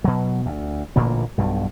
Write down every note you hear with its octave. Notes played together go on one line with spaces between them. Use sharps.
B2 F#3
D2
A1 A#2 D3 A#3
B1 G2 B2